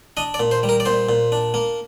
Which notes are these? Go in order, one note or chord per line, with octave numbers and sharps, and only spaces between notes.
D4 D#5
D5
A#2
C5
G3
A#4
D5
A#2 C5
A#2
D4
A#3